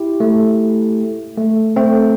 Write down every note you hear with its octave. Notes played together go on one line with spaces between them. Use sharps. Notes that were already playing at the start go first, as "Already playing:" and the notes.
Already playing: E4 G4
A3
A3
A3 C4